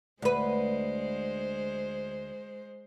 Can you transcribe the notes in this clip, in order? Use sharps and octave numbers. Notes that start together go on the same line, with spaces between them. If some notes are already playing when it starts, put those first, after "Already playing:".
D2 G#3 B4 C5